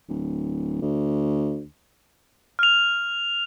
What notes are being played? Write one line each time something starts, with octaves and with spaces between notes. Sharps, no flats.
D1
D2
F6 F7